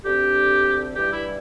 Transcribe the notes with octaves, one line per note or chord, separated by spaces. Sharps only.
D2 D3 C4 G4
G2 E3 G3 G4
E4